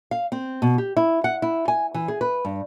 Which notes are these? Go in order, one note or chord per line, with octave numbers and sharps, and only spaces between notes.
F5
C4
B2
G4
E4
F#5
E4
G#5
E3
G#4
B4
G2